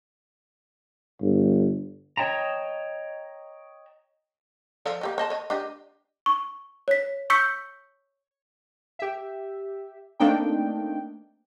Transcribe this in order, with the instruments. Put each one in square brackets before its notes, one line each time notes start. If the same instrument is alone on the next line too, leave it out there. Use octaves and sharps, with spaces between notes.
[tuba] G1
[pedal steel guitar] C#5 D#5 G5 A5 A#5
[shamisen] F3 A4 D5
A#3 G4 D#5
C5 D#5 A5
C#5 D#5
D4 G4 D#5
[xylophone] C#6
C#5 B6
C#6 E6 G6 B6 C#7
[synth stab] G4 E5
A3 A#3 C4 D4 D#4 G5